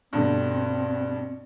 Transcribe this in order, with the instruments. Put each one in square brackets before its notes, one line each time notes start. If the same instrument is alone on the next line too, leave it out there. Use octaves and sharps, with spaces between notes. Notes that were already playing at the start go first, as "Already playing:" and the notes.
[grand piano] G2 B2 D3 [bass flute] C4